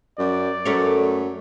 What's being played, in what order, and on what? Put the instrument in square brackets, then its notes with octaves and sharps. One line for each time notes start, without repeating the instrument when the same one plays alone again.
[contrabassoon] F#2 [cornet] D5
[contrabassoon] F#2 [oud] A3 A#4 C#5